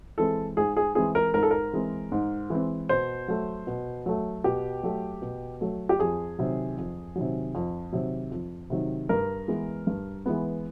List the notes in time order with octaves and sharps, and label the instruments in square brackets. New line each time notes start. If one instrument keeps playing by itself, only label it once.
[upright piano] E3 G#3 C4 A4
G#2 G#4
G#4
E3 G#3 C4 G#4
A#4
G#2 A#4
A4
A#4
E3 G#3 C4
G#2
E3 G#3 C4
B2 C5
F#3 A3
B2
F#3 A3
B2 G4
F#3 A3
B2
F#3 A3
G4
F2 G#4
C3 D#3 F#3
F2
C3 D#3 F#3
F2
C3 D#3 F#3
F2
C3 D#3 F#3
G2 A#4
E3 G#3 B3
G2
E3 G#3 B3